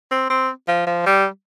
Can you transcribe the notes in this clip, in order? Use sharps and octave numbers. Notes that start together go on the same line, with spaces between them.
C4
C4
F3
F3
G3